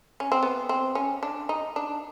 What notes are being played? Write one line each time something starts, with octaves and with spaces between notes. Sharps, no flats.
C#4
C4
B3
C4
C#4
D4
D#4
D4